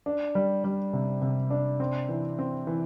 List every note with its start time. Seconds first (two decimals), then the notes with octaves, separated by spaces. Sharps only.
0.06 D4
0.35 G3
0.64 G3
0.93 C3
1.22 C3
1.50 D4
1.80 C4
2.09 E3
2.39 C4
2.67 E3